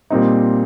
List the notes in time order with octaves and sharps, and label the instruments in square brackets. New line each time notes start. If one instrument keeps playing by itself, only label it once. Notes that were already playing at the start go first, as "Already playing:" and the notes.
[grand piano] A#2 G3 C4 D#4